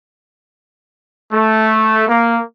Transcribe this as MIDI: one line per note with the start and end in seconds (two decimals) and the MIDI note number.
1.32 2.04 57
2.08 2.41 58